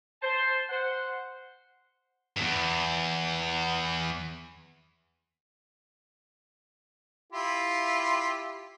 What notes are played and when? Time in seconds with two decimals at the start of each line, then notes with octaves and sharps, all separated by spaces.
0.22 C5 A5
0.70 C5 F#5
2.36 E2 G2
7.32 E4 F4 G4